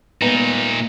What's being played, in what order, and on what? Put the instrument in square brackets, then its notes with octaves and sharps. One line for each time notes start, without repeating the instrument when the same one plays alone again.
[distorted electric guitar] A#2 D#4 [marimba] G#3 A#3 [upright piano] B3